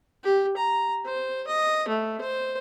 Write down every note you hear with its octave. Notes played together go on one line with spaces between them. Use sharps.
G4
A#5
C5
D#5
A3
C5